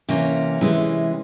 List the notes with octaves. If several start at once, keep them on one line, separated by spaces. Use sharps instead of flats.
C3 E3 A#3 C#4
C3 E3 G#3